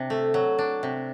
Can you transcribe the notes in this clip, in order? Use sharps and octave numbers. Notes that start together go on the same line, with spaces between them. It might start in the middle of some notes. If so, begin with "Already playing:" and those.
Already playing: C3 D4
A3
F#3
D4
C3